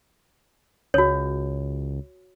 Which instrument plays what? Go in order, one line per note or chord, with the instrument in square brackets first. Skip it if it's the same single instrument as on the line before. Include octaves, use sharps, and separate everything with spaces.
[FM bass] C#2 [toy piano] F#4 C#5